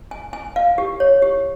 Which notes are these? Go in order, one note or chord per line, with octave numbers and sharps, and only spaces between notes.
G#5
G#5
F5
G4
C#5
G4